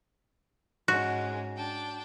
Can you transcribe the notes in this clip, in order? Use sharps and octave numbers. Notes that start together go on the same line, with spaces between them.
G#2 G#3 C#4 F#4
D4 G5 A5